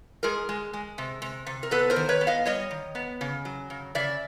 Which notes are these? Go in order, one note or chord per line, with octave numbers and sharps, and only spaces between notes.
G#3 G#4 A#4
G#3
G#3
C3
C3
C3
A#4
B3 A4 B4
A#4 C5
D#3
B4 C#5
B3
D#5 F5
G3 C#5 D#5
D#3
B3
C#3
F#3
C#3
C#3 D5 E5